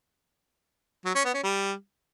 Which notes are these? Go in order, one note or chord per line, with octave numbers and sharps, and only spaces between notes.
F#3
C#4
B3
C#4
G3